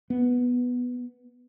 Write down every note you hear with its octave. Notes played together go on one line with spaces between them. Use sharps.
B3